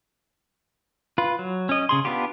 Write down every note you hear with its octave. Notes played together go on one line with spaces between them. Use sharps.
F4 B4
F#3
C#4 D#5
C#3 G#4 C6
B3 D4 F4 G4